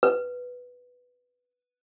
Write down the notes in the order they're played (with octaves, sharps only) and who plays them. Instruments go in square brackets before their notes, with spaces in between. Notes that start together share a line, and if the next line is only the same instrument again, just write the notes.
[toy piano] B4